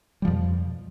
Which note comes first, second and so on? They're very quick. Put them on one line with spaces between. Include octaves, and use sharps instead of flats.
G3 F3 F2 B2